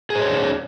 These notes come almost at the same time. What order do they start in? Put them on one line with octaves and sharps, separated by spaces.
G#4 C5 C#5 D4